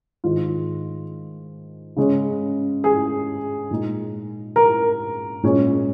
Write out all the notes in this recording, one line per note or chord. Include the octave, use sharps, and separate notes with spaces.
G#2 D#3 G#3 F4
C#3 G#3 C#4
G#4
A#2 G#3 D#4
A#4
A#2 G#3 C#4